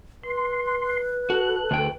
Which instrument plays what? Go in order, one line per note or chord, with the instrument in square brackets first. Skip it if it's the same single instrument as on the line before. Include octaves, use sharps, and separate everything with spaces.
[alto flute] B4 [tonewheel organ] C6
[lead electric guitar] F#4 [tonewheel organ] A4 F#6
[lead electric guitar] D2 G5